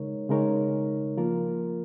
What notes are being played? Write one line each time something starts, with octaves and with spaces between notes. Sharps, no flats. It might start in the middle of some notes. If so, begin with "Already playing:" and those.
Already playing: C#3 G#3 D#4 A#4 C#5
C#3 G#3 D#4 A#4 C#5
F3 A#3 F4 A#4